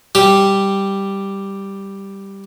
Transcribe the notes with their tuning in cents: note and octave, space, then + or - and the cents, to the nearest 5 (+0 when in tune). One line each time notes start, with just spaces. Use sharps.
G3 +0 G4 +0